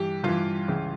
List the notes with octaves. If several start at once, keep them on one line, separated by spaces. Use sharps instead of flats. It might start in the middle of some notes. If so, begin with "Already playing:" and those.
Already playing: G2 E3 G4
G2 E3 F4
C#2 C#3 E3